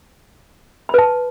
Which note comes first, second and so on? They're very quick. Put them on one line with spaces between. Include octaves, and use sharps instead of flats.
B5 B4 A5